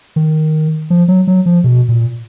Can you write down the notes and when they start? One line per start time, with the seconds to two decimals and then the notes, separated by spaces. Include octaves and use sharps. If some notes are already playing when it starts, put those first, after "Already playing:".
0.16 D#3
0.90 F3
1.08 F#3
1.27 F#3
1.46 F3
1.64 B2
1.89 A#2